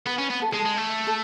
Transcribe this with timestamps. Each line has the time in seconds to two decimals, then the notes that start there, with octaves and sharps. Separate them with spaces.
0.06 B3 B4
0.19 C#4
0.30 B3
0.42 A4
0.51 G#4
0.54 G#3
0.59 A4
0.65 G#3
0.77 A3
1.07 A4